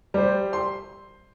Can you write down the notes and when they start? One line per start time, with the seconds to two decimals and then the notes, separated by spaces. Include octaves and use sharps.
0.14 G3 C5
0.53 C6